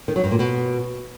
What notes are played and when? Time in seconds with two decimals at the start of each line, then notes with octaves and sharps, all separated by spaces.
0.08 D#3
0.16 F#3
0.24 G2
0.31 A#2
0.39 B2